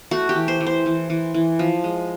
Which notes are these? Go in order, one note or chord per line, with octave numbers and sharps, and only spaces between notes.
A3 F#4
G4
E3
C5
E3
C5
E3
E3
E3
F3
G#3